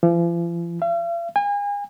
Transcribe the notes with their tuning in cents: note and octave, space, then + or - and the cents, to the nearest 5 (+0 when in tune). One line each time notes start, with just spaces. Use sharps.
F3 -45
F5 -45
G#5 -35